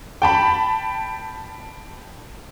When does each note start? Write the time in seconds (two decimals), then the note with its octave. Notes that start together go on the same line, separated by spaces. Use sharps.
0.22 G5 A5 B5